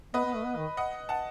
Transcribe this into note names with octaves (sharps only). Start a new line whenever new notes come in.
B3 B4 D#5
B3
A3
B3
D#3
D#5 F#5
F#5 A5